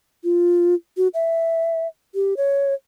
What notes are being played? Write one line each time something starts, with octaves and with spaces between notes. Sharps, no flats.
F4
F#4
E5
G4
C#5